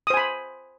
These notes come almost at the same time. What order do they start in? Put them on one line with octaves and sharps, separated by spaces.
D#6 C5 G#5 B5